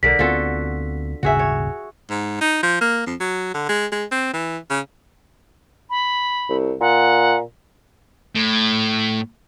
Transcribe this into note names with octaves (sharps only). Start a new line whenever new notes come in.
B1 D3 A#4 D5 B6
D2 B3 C4 F4 F#4 A4
D#1 G#1 C#3 F#4 G#4 E5
C#5
G#2
D#4
F3
A#3
F2
F#3
D3
G#3
G#3
C4
E3
C#3
B5
C2
A#2 F#5
A2